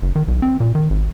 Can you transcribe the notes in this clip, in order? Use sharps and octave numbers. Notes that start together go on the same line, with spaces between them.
F#1
D#3
B1
C4
A#2
D#3
G#1